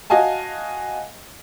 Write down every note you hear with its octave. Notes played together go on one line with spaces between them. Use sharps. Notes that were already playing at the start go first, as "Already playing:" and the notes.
F#4 D#5 F5 G#5 A5